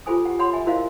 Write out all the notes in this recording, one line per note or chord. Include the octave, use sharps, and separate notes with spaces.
F4 G4 A4 C5 G#5 D#6
G4 F#5
C#5 F#5 B5 C6
E5 G#5
E4 F#4 A#4 C5 D#5 F5